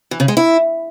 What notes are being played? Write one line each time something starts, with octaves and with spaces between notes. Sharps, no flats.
E3
C#3
G#3
E4